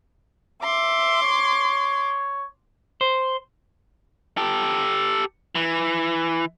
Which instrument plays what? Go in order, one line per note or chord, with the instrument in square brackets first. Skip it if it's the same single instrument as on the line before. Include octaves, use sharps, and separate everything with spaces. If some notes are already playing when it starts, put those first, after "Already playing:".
[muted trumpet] E5 [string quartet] C6 D6
[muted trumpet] C#5
[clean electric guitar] C5
[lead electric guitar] G4 A4
E3